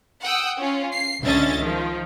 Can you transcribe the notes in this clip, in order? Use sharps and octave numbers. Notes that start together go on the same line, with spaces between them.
F#5 G5 D#6 E6
C#4 F4
C7
C#2 D3 C#4 D#5 E5 A6
D#3 F3